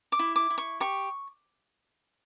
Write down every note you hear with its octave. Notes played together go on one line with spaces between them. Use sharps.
D6
E4
D6
E4
C#6
G4 C#6